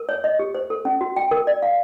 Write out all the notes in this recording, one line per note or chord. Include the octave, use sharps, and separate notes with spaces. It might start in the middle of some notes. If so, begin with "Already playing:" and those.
Already playing: A#4
C#5
D#5
G4
C5
A4
C#4
F#4
G5
A#4
D5
F5